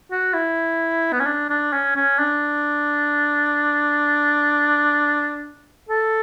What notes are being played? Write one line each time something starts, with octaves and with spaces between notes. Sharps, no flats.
F#4
E4
B3
C#4
D4
D4
C#4
C#4
D4
A4